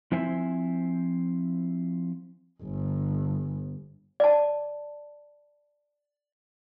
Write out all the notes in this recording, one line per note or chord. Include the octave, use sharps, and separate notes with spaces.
F3 C4 E4 C5 E5 G#5
G1
D5 A5